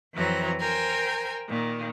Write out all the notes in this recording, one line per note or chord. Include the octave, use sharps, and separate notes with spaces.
F2 E3 F#3 C4 A#5
A#4 C5 G5 G#5 A#5
A#2 D#3